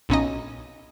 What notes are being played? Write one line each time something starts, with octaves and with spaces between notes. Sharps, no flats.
B1 A#2 C#4 D#4 D#5